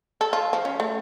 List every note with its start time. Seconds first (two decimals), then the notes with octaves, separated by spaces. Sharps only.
0.21 A4
0.33 F4
0.53 F3
0.65 C#4
0.80 A3